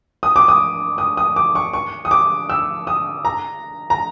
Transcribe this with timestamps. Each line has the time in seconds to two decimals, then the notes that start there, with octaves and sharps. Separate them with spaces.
0.23 D#6
0.36 D6
0.48 D#6
0.98 D#6
1.17 D#6
1.36 D6
1.55 C#6
1.73 C#6
2.05 D#6
2.11 D6
2.50 E6
2.87 D#6
3.25 A#5
3.90 A#5